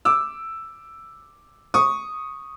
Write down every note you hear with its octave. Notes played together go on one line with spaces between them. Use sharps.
D6 E6
C#6 D#6